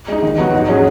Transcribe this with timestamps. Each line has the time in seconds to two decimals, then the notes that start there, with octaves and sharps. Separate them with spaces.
0.08 G#3 D#4
0.22 D#3
0.38 F#3 B3 F#4
0.53 G#2
0.68 F#3 C#4 G#4